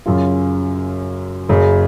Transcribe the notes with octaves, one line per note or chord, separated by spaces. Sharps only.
F#2 C#3 F#3 C#4 F4
F#1 F#2 C#3